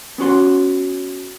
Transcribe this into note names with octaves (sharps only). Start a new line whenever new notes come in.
B3 C#4 F#4 C6